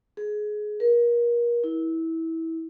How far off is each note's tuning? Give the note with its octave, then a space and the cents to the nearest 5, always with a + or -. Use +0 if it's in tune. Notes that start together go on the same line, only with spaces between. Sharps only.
G#4 +20
A#4 +30
E4 -20